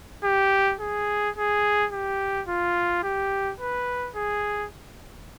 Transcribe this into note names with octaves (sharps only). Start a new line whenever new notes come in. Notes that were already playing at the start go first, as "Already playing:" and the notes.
G4
G#4
G#4
G4
F4
G4
B4
G#4